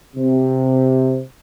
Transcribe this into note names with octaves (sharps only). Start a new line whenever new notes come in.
C3